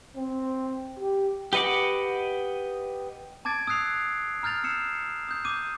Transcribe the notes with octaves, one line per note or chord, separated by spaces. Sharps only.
C4
G4
G4 B4 D#5 F#5 D6
A5 D6 G#6 A6 D7
D#6 E6 F#6 C7 F7
A#5 F6 G6 A6 F7
E6 C7 C#7 E7
D#6 G6
D6 D#6 G6 D#7